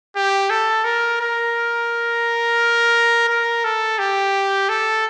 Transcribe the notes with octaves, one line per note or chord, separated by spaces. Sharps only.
G4
A4
A#4
A#4
A#4
A4
G4
A4